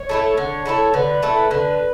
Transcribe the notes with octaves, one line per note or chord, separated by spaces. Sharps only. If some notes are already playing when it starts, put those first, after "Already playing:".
Already playing: C#5
A3 E4 A4
D3
A3 E4 A4
D3 B4
A3 E4 A4
D3 B4